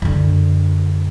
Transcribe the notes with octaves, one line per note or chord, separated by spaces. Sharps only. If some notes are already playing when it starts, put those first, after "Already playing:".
F#2 D3